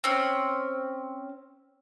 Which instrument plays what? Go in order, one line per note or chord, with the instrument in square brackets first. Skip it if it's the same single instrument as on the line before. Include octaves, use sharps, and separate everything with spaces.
[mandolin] C4 C#4